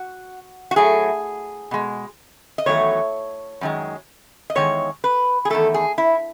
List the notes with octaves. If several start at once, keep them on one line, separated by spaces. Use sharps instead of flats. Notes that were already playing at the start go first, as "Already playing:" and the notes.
Already playing: F#4
F#4
A2 F#3 A3 G#4
B2 G#3
D#5
E2 D#3 F#3 A3 C#5
F#2 D#3 G#3
D#5
E2 D#3 G#3 C#5
B4
G#4
E2 D#3 A3 A4
G#4
E4